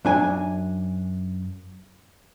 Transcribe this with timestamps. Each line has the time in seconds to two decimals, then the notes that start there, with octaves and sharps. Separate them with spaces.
0.05 F#2 D4 G#5